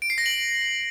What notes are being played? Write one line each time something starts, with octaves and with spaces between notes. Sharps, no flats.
D7
C7
A#6
F#7